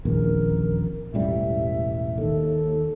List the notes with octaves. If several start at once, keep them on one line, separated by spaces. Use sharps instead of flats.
D#1 A#1 E2 A#4
E1 A1 G3 E5
D#2 A4